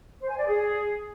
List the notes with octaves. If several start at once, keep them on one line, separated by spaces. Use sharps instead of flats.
C5
G#5
D5
G#4